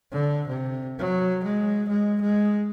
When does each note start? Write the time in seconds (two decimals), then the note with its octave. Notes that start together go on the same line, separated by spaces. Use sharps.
0.12 D3
0.48 C3
0.99 F#3
1.43 G#3
1.88 G#3
2.21 G#3